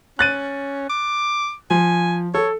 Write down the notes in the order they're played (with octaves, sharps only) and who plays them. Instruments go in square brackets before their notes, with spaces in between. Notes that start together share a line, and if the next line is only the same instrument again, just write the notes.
[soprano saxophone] C#4 [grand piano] F#6 A6 D#7
[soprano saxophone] D6
[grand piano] F3 [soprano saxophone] G#5
[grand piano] A4 [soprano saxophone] C#5